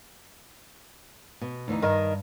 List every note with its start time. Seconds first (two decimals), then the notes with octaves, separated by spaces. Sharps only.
1.41 B2
1.68 D2 E3 D#4
1.82 G2 D#3 A#4 D#5